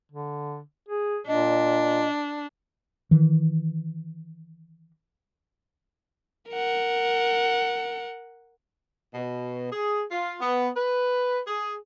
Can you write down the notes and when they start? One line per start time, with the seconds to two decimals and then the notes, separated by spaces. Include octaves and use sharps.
0.12 D3
0.89 G#4
1.28 A#2 D4 D#5
3.11 D#3 E3
6.50 A#4 F#5
9.14 B2
9.72 G#4
10.11 F4
10.41 B3
10.76 B4
11.46 G#4